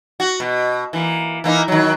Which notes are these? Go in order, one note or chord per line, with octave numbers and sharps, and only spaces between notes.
F#4
B2
E3 A#3
E3 A#3 D#4
D#3 F#3